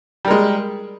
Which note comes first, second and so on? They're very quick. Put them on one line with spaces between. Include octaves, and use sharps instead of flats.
G3 A#4 G#3